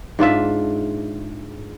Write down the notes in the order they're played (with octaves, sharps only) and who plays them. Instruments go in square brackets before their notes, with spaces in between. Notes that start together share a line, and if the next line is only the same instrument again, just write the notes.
[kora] G#2 D4 F4 E5